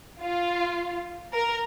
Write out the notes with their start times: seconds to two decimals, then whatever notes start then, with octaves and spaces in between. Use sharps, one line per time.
0.21 F4
1.33 A#4